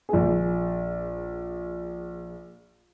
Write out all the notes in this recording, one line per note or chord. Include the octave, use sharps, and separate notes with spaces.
A#1 G#4